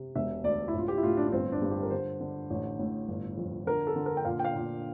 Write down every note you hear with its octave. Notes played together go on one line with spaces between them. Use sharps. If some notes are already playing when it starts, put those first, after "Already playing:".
Already playing: C3
E1 E5
D2 D5
E4
A1
F4
G4
E4
A2 F4
D4
D4
G1 C4
D4
G2
G4
A#4
D3 C5
D3
A1
A2
G1
F2
D3 A#4
A4
D3
A#4
G5
A#2 F5
G5
F5
A#2